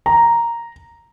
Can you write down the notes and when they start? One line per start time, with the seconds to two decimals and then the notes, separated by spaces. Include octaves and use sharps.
0.06 A#5